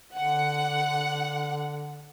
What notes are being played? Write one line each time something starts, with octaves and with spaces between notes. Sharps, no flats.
D3 F#5